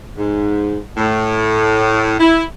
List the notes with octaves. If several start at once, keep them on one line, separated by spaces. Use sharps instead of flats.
G#2
A2
E4